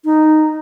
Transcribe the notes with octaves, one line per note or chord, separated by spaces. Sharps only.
D#4